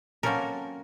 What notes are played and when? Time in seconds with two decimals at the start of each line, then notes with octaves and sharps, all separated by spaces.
0.23 F#3 A#3 C4 C#4 A4 A#4